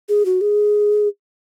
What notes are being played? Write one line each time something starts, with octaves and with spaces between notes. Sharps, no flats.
G#4
F#4
G#4